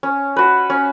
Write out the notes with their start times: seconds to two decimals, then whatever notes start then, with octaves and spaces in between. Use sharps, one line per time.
0.03 C#4
0.36 F#4 B4
0.70 C#4